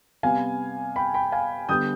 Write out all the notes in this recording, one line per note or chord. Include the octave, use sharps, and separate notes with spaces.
C3 G3 B3 F5 G#5
G5 B5
G5 B5
F5 G#5
D3 G3 B3 D#6 G6